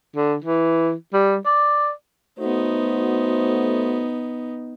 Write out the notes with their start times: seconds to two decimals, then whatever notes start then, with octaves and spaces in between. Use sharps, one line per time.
0.16 D3
0.44 E3
1.13 G3
1.46 D5
2.39 A3 B3 D#4 F#4 C5